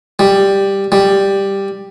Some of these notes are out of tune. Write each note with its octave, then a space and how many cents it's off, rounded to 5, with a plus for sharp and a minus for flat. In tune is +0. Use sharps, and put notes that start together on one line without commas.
G3 +5
G3 +5